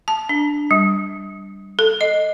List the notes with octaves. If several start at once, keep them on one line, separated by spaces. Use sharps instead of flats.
A5
D4
G3
A4
D#5